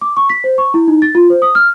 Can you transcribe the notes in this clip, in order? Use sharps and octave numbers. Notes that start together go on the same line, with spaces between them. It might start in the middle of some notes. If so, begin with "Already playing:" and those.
D6
C#6
B6
C5
C#6
E4
D#4
A6
F4
C5
D#6
F6